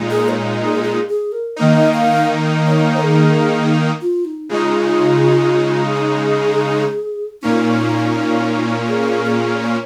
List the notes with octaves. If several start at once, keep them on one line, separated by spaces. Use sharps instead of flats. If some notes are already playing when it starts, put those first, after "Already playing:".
Already playing: A#2 G#3 D#4
G#4
C#5
G#4
G#4
G#4
A#4
D#3 A#3 D#4 D#5
F5
C#5
G#4
F4
D#4
C#3 G#3 D#4 F4
G#4
A#2 A#3 C#4 D#4
G#4
G#4
C#5